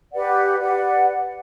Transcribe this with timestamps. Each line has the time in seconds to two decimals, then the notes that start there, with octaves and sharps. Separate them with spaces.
0.13 G4 B4 D5 F#5
0.60 G4 B4 D5 F#5